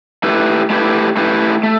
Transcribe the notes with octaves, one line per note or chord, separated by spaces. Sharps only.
A3 E4 G4 B4
A3 E4 G4 B4
A3 E4 G4 B4
A3